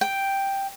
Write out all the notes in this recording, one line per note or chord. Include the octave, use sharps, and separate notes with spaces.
G5